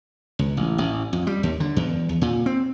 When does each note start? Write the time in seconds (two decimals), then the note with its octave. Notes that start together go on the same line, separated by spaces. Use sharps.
0.39 C#2
0.57 A1
0.78 A1
1.13 F2
1.27 G3
1.43 D#2
1.60 D3
1.76 E2
2.09 E2
2.22 A#2
2.46 C4